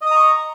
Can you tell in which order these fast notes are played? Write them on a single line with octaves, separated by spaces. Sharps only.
D#5 D#6 A#5 C#6